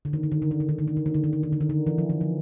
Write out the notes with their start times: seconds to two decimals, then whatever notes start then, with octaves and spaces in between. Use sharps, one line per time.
0.05 D3
0.13 D#3
0.23 D3
0.32 D#3
0.42 D3
0.51 D#3
0.60 D3
0.69 D#3
0.78 D3
0.88 D#3
0.97 D3
1.06 D#3
1.14 D3
1.24 D#3
1.33 D3
1.43 D#3
1.52 D3
1.61 D#3
1.70 D3
1.87 E3
1.98 F3
2.10 E3
2.21 F3